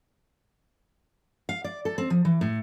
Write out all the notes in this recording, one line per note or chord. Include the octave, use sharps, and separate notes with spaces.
F5
D5
A4
C4
F3
E3
A2